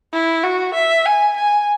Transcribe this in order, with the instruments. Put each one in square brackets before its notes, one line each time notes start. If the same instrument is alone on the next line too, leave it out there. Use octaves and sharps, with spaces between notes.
[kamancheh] E4
F#4
E5
G#5
G#5